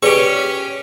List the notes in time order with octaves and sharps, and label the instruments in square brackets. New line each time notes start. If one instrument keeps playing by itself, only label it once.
[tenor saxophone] C#4 [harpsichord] G4 C#6 [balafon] G#4 B4 D5